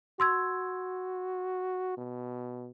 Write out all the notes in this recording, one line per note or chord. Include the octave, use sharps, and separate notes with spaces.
F#4 C6 E6 G#6
B2